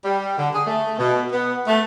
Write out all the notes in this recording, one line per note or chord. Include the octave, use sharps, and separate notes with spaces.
G3
D3
G#4
A3
B2
B3
A3